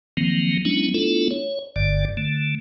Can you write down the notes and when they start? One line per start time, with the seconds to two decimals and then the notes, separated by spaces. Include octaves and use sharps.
0.17 D#3 F3 F#3 A#3 C4
0.65 F#3 G#3 B3 C#4 D4 E4
0.94 A3 B3 D4 E4 F4 A4
1.31 C#5
1.76 G1 G2 D3 D5
2.17 D3 A3